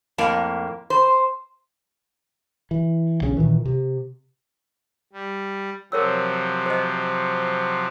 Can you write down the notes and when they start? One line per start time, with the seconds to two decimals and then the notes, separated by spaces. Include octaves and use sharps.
0.18 F2 A2 A#3
0.90 C5
2.71 E3
3.21 B1 C#3 C#4
3.37 A#2 D#3 E3
3.65 C3
5.13 G3
5.92 C3 F3 F#3 A#4 C#5 E6
6.66 C5 D#5